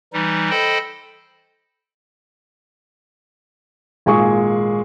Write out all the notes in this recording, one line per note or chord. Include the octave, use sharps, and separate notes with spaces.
E3 G3 D#4
A4 C5 D#5 G5 B5
G#1 A#2 G#3 G#4 C#6